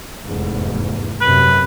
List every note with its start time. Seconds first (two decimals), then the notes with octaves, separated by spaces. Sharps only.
0.23 F1 E2 G#2
1.21 F#2 C3 B4